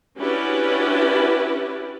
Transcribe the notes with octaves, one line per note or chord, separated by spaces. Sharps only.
C#4 D4 E4 F#4 G4 B4